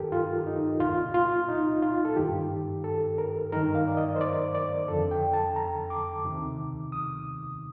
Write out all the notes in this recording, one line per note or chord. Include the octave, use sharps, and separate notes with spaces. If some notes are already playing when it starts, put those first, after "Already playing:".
Already playing: G2 D#3 G4 A4 A#4
F4
D#4
C2 A#2 F4
F4
D#4
F4
A4
G2 D#3 G4
A4
A#4
G2 D#3 A#4
F5
D5
D#5
C5
D5
D5
F2 D3 A4
G5
A5
A#5
D6
D2 C3 D#3
D#6